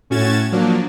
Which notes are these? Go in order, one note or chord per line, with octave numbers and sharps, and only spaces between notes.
A2 C#4 F#4 G#6 A6 E7
F3 F#3 A#3 D4